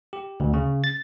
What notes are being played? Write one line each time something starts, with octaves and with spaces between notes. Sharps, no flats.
G4
D2
C#3
A6